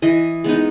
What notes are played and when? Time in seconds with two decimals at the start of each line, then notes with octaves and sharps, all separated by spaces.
0.02 E3 D#5
0.44 G#3 B3 D#4